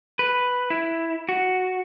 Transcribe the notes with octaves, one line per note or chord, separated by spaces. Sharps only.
B4
E4
F#4